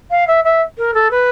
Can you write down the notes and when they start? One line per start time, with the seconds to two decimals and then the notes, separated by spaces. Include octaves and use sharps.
0.11 F5
0.27 E5
0.44 E5
0.78 A#4
0.94 A4
1.11 B4